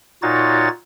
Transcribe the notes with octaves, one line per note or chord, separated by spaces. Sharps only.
A#2 D#4 F4 F#4 C#5 A6